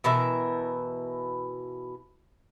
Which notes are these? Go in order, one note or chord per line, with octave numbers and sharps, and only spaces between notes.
B2 E3 A#4 E5